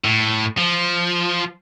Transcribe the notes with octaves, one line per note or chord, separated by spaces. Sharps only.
A2
F3